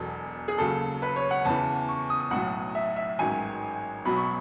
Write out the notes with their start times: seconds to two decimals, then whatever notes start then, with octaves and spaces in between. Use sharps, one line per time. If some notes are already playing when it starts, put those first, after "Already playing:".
Already playing: E1 E2 B2 F#3 A4
0.48 G#4
0.58 D#2 C#3 F#3 A4
1.02 B4
1.16 C#5
1.31 F#5
1.45 E2 C#3 E3 A5
1.88 C#6
2.10 D#6
2.20 D#6
2.31 B1 A2 F#3 F#5
2.75 E5
2.96 E5
3.19 A1 G#2 D#3 F#3 G#5
4.05 B1 B2 F#3 B5
4.17 C#6